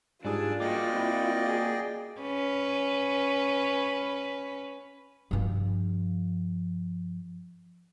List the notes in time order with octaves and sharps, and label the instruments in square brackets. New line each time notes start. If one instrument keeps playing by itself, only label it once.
[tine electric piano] G#2 G3 G#4 [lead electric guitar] D4 [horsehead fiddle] F4 [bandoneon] A4 G#5 A5
[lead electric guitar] A#3 F#4 [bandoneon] D5 D#5 G5 [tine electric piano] D6
[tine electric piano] C4 E4
[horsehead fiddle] G#4 [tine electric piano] A#6
[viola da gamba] C#4 B4
[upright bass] G2 F3